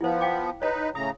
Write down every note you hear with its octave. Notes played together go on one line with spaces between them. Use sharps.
F3 B3 E4 C5
F5 G5 D6
D#4 B4 C#5 A#5
A2 C#3 A#5 D#6